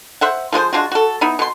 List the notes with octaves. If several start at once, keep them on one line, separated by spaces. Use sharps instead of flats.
C5 E5 F#5
F3 G#3 F4 C5
G#3 D4 F4 F#4
F#4 A4
B3 D#4 E4
B2 C6